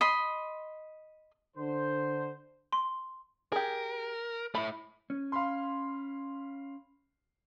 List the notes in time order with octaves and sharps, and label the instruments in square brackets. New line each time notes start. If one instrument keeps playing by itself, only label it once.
[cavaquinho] D#5 B5 C6
[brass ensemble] D3 C5
[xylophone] C6
[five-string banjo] G4 G#4 [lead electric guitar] A#4
[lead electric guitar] A3 E4 [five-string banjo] B5
[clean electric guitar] C#4
[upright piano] F5 B5 C6